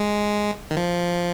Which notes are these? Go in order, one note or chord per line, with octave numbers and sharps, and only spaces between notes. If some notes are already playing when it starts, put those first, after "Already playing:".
Already playing: G#3
D#3
F3